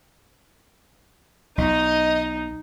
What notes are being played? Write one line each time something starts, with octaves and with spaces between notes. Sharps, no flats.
B1 D#4 D#5